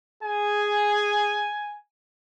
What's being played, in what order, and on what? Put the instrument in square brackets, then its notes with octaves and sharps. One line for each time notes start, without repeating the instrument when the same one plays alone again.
[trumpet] G#4 [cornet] G#5